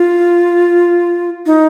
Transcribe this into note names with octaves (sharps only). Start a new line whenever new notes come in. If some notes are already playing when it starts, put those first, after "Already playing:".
Already playing: F4
D#4